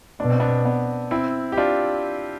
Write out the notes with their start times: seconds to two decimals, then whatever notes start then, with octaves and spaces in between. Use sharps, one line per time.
0.20 B2 D4
0.30 C4
0.40 B3 D4
0.65 B3 D4
1.11 C4 E4
1.52 G4
1.57 D4 F4